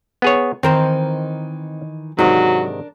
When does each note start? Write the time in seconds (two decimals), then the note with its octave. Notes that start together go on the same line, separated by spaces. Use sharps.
0.22 B3 G#4 C#5
0.63 D#3 E3 C4 D#4 A#4 C5
2.19 G#2 C3 D#3 F#3 D4 A#4